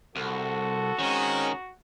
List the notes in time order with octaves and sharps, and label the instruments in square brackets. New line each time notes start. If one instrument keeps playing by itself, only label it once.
[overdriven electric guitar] C2 [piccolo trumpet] F#4 [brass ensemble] A4
[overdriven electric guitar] D#3 [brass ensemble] G#3 C4 C#4